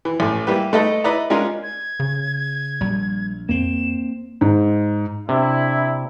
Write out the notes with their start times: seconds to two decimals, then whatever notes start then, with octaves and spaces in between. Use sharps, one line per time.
0.05 E3
0.20 A1 A3
0.47 G3 A#3 E4 G4 B4
0.73 A3 D#4 A4 B4 D#5
1.04 E4 B4 D5 D#5 A#5
1.30 G#3 C#4 D4 F4 A#4
1.63 G#6
2.00 C#3
2.81 A#1 G3
3.49 F2 A#3 C4 E7
4.41 G#2
5.29 C3 D4 E4